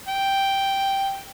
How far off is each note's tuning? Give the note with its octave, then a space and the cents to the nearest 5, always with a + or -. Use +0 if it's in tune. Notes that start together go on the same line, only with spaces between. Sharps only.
G5 +0